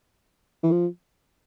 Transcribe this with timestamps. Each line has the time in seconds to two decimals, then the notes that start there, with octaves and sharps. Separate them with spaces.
0.63 E3
0.71 F3